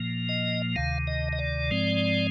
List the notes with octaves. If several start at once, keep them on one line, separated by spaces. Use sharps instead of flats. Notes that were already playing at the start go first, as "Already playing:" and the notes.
Already playing: A#2 F3 A#3
D#5
D2 C3 D#3 F5
D#5
D#5
D5
G#2 F3 G#3 C4